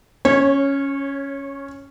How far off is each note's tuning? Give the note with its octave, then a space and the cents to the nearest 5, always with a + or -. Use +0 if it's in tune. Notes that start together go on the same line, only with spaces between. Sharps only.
C#4 +0 C#5 -25